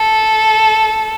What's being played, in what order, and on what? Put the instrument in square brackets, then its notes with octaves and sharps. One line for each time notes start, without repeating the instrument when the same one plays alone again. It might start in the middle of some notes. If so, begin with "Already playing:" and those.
Already playing: [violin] A4